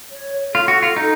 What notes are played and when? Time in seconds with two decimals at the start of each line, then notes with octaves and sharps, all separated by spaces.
0.11 C#5
0.54 F4 A4
0.68 F#4
0.83 F4
0.97 D#4